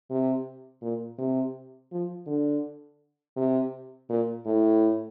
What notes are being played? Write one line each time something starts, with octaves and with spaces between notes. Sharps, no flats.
C3
A#2
C3
F3
D3
C3
A#2
A2